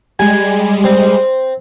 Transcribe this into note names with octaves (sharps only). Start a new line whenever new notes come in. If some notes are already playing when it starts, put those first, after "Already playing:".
G3 G#3 G#5
C4